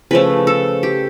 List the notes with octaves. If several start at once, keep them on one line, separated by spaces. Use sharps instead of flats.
C#3 F3 A3 B4
A4
G4